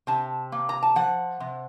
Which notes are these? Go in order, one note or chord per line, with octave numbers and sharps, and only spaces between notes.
C3 A5
A#3
A#5
A5
F3 F#5
C3